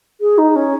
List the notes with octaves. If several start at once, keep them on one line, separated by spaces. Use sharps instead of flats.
G#4
D#4
C#4